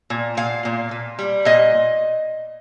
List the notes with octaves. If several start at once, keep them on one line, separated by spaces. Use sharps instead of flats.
A#2
A#2 F5
A#2
A#2
G3
A#2 D#5